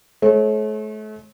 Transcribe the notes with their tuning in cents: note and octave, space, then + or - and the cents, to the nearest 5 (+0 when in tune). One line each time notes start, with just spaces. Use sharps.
A3 -40 C#5 -35